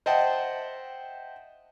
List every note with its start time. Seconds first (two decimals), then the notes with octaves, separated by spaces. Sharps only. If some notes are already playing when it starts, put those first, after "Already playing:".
0.06 C5 D#5 E5 F#5 G5 A5